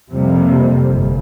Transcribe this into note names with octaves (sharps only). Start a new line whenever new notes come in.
F2 C3 G3 A#3
G1 G2